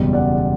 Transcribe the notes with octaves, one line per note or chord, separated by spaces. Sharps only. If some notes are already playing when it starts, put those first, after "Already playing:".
Already playing: F#1 E2 B2 G3
D5 F#5